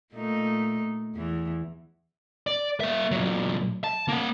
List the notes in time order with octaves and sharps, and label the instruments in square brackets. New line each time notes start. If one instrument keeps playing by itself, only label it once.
[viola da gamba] A#2 A3 D#4
E2 E3
[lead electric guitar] D5
A#3 E5
A#2 F#3
A5
A#3 F#5